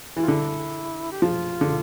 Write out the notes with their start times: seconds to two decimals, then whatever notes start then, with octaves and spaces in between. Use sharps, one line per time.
0.16 E3
0.23 F4
0.28 D3 E4
1.12 G4
1.22 F3 F4
1.61 D3